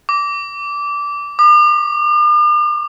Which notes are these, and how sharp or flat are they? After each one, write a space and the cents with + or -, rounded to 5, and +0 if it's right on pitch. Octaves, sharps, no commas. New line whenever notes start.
D6 -20
D6 +45